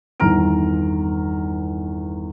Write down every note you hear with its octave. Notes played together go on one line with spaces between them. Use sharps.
G1 E2 D#3 A#5 F6 D7